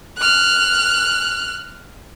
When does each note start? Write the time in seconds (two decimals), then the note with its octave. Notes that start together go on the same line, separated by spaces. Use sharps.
0.17 F6 F#6